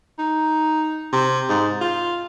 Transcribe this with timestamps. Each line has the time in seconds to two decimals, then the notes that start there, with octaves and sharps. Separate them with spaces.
0.19 D#4
1.13 C3
1.49 G#2
1.81 F4